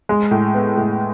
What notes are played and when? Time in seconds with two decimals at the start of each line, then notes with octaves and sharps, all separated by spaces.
0.09 G#3
0.31 A2
0.54 B3
0.77 A2